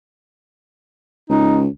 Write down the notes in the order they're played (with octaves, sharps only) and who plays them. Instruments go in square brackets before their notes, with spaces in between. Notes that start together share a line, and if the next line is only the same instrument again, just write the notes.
[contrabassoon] C#2 [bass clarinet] D#4